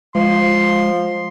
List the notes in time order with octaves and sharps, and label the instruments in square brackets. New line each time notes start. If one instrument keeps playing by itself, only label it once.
[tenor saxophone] F3 [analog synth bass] G#3 [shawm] C6